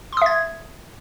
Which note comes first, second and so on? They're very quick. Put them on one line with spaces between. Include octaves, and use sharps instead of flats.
C6 D#6 E5 G#6